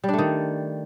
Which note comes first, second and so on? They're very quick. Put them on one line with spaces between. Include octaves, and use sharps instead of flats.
G3 D4 A3 D#3